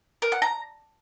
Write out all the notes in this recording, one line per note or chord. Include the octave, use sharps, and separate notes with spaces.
A#4
F#5
A#5